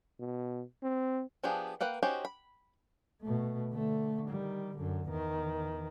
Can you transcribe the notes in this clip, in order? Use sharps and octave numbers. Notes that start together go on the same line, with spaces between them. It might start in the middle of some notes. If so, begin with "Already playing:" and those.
B2
C4
F3 B3 D4 G4 G#4
A#3 B4 F#5 G5
C#4 D#4 F#4 G4 C5
B5
B2 A3
D3 A3
D#3 G3
F#2 D3
E2 D#3